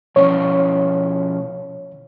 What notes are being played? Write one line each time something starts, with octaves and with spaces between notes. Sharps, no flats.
B2 F3 C#4 C#5